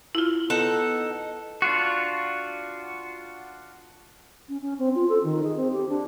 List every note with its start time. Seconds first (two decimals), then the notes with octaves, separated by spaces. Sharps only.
0.15 E4 F4
0.50 B3 D#4 A4 F#5
1.62 D4 F4 F#4
4.49 C#4
4.62 C#4
4.79 C4
4.95 F4
5.09 A4
5.23 D#3
5.44 G#4
5.57 C4
5.72 G4
5.89 D4